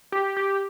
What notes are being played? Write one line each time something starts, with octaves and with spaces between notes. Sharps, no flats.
G4
G4